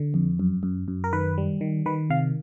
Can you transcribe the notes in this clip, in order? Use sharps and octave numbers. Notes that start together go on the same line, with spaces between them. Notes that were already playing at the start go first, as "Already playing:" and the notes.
Already playing: D3
F2
F#2
F#2
F#2
A#4
D#3 B4
G3
D#3
D#3 B4
C3 F5